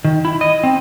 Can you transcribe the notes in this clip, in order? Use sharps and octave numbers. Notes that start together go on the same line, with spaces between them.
D#3
E4
D#5
C4